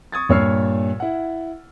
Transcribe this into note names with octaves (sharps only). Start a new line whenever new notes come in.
C#6 D#6 G#6 A6
G2 A#2 C#5 E6 F6 C7
E4 F#5